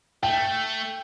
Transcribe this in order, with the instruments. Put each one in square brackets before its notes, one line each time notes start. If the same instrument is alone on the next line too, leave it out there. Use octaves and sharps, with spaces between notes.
[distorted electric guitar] A3 [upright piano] G5